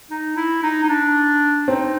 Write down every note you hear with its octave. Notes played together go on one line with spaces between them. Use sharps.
D#4
E4
D#4
D#4
D4
C4 D#4